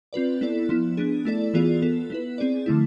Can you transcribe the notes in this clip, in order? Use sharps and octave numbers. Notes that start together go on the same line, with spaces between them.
C4 F4 B4 D5
B3 E4 A4 D5
F3 B3 E4
B3 D4 G#4
A3 E4 A4 D5
E3 B3 F4 G#4 D5
B3 F4 A4
B3 E4 B4
C4 G#4 D5
D3 F3 A3 E4